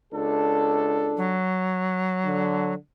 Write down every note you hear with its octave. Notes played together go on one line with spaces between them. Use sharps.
C#2 D4 A4
F#3
D3